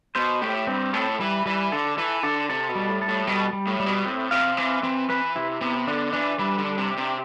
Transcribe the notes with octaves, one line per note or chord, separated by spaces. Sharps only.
B2 C5
A2 G4
G2 C4
A2 A4
E3 G3
E3 G3
D3 A4
E3 A4
D3 A4
C3 A4
B2
G3
A2
A4
A2
B2 G3
G3
A2
G3
B2
A2 C4
C3 F5
E3 C4
E3 C4
E3 B4
C3 E4
C3 B3
D3 D4
E3 D4
E3 G3
D3
D4
C3
G4
C3